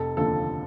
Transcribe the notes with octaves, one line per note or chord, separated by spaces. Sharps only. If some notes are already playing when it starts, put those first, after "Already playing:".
Already playing: F1 A4
D#2 D3 F3 A4